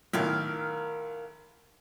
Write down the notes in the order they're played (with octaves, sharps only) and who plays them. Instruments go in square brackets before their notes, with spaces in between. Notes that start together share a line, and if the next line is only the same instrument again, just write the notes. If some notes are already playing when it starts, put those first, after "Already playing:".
[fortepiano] B1 A2 D#3 [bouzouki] A#4 F5